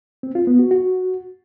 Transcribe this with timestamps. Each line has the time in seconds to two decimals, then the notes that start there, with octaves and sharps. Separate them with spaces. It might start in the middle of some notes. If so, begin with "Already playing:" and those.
0.23 C4
0.35 F4
0.47 B3
0.59 F#4
0.71 F#4